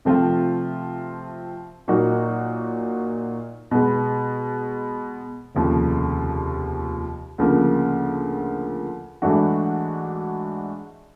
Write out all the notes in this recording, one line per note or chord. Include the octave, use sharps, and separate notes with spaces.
C3 F3 A3 C4 F4
A#2 F#3 A#3 D#4 F#4
B2 G#3 B3
F1 D#2 C#3 F3
D2 C#3 F3 A#3
G#2 E3 A3 D4 F#4